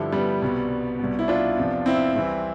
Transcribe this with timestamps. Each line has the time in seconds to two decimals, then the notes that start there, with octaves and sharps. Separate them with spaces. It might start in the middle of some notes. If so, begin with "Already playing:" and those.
Already playing: G2 D3 F3 E4 G4
0.13 G3 B3
0.42 C2 B2
0.99 C2 B2
1.19 E4
1.28 D4 F4
1.57 E2 C3 F3
1.86 C4 E4
2.16 C2 C3 E3